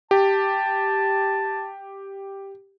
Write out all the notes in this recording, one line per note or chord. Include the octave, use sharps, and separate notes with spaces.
G4 A5